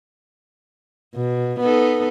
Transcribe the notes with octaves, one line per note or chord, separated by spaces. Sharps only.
B2
B3 D#4 A4